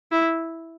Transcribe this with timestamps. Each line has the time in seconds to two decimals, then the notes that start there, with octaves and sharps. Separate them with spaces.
0.12 E4